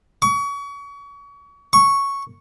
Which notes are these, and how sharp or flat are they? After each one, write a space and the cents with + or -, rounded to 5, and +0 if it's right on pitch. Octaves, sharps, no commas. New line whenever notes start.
C#6 +35
C#6 +0